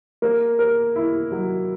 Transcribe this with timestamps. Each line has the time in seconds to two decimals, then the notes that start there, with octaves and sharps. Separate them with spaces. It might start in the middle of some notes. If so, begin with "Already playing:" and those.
0.22 A#3
0.59 A#4
0.96 E4
1.32 F#3